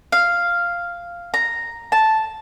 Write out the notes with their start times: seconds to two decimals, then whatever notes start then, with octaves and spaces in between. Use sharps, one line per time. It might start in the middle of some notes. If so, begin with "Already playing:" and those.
0.12 F5
1.34 A#5
1.92 A5